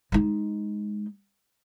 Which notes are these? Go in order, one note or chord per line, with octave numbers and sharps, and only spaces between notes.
G#3 D#4